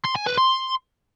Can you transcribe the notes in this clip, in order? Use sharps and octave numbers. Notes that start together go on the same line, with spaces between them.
C6
G#5
B4
C6